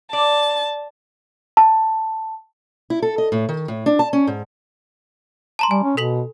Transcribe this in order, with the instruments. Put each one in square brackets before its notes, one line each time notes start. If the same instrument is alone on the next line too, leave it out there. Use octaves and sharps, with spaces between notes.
[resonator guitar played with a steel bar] D5 [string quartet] A5
[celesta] A5
[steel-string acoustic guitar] E4
A4
D#5
A2
D#3
A2
D4
A5
C#4
G#2
[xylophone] A5 A#5 C6
[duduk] G3 [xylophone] G#5
[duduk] C#4
[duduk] B2 [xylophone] A4 B6 F#7